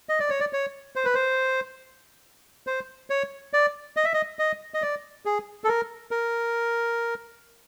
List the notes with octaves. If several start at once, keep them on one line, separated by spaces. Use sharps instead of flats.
D#5
D5
C#5
D5
C#5
C5
B4
C5
C5
C#5
D5
D#5
E5
D#5
D#5
D#5
D5
G#4
A4
A#4
A#4